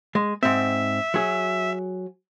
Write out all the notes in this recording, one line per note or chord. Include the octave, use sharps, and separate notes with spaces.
G#3
G#2 C4 E5
F#3 G#4